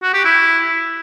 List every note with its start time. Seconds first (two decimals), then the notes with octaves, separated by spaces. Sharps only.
0.03 F#4
0.14 G4
0.25 E4